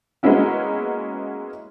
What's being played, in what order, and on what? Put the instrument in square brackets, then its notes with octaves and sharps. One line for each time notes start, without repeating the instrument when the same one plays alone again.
[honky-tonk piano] G#3 A#3 B3 C#4 E4 F#4